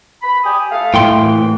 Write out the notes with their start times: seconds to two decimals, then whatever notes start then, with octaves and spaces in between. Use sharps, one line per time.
0.23 B5
0.44 G4 G#5 D#6
0.72 A3 F5
0.94 A2 G5 C6
1.18 C2 F2 E3